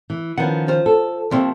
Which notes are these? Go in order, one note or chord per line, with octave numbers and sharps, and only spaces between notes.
E3
D#3 F3 B3 C#4 F#5
F4 C5
A4
C3 F3 A3 A#3 C4